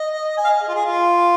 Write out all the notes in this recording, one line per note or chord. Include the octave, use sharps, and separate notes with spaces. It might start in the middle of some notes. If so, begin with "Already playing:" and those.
Already playing: D#5
G#5
F5
D#5
G#4
F4
G#4
F4